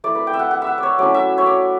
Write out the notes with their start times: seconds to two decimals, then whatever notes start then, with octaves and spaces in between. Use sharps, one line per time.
0.04 A3 E4 D5
0.15 B4
0.27 G5
0.34 E5
0.39 F#5
0.51 F#5
0.62 E5
0.67 F#5
0.78 D5
0.83 C#5
0.99 F#3 A3 C#4 E4 D5
1.14 E5
1.38 C#5
1.46 D5